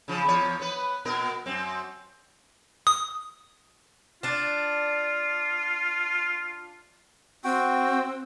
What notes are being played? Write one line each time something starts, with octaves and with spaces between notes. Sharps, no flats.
C#3 F3
E2 F3 C#5
B3 B4
A#2 B3 A#4
F#2 C4
D#6
D4 F4 A5
C4 F#4 G5